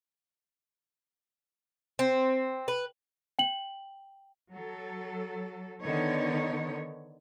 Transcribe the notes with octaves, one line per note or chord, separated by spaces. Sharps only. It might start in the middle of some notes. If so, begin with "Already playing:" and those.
C4
B4
G5 F#7
F#3 A4
D3 D#3 B3 D#4 C#5